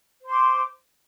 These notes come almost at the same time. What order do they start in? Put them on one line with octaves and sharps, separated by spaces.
C5 C6 D6